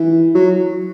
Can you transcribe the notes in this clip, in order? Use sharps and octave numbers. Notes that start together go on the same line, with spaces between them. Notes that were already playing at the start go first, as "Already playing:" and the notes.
Already playing: E3
F#3